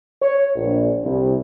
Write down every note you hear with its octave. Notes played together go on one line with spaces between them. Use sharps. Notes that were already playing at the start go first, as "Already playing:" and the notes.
C#5
A#1
C2